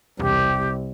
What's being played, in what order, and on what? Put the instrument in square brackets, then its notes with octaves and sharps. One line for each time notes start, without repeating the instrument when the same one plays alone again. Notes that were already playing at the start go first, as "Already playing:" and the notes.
[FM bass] E1 [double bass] C2 [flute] G4